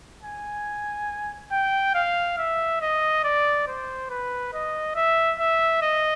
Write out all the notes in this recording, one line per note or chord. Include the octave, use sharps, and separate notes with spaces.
G#5
G5
F5
E5
D#5
D5
C5
B4
D#5
E5
E5
D#5